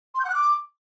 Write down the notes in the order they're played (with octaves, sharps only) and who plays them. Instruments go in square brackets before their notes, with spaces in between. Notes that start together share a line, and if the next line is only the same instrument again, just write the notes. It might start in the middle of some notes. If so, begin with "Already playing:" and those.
[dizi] C6
G6
F#5
F#6
D6